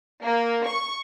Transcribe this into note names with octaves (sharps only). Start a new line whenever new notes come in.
A#3
C#6